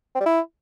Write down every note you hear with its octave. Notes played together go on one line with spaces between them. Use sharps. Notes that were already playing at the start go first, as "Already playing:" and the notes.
C4
G3
E4